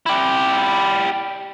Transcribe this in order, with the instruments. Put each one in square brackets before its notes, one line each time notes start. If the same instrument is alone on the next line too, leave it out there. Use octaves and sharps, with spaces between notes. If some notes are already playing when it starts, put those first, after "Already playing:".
[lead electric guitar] E4 G4